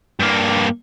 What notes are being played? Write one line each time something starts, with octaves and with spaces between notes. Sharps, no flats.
G2 A#3